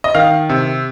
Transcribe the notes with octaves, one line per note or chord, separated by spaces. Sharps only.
D#5
D#3 F5
C3